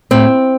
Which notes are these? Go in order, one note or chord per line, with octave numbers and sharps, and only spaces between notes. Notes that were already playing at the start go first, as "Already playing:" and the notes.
A2 C4